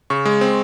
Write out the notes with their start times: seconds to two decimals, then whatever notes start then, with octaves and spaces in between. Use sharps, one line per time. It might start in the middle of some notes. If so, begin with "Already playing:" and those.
0.10 C#3 C#6
0.25 G#3
0.41 C4